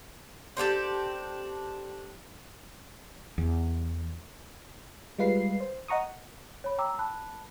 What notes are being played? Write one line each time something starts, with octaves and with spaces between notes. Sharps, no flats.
C4 D4 G4 A4
E2
G3 G#3 F4 B4 C7
C5
D#5 F#5 A#5 C#6 D#6
C#5 B5
G5 A#5 D6 E6
A5 B5 F#6